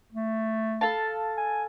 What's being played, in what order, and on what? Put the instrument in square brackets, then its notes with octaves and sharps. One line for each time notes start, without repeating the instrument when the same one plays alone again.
[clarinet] A3
[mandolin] A4 F5 A5
[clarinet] G#5